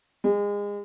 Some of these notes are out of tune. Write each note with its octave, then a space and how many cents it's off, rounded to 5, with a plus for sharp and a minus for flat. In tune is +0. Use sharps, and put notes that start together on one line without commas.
G#3 -30